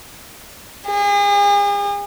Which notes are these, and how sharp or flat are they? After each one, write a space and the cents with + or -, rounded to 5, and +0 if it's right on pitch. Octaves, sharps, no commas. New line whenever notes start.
G#4 -40